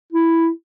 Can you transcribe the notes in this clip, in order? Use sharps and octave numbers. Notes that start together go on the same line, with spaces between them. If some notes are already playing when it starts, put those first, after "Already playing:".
E4